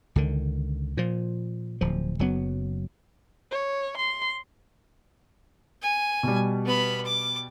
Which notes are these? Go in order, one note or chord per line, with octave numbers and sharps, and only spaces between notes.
C#2 D3 D#3
A#2 F3
D1 F3
F#1 F#3 B3
C#5
C6
G#5
B2 G3
B3 B5
D6